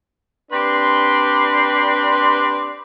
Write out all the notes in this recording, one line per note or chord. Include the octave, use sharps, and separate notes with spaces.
C4 D4 G4 B4 C6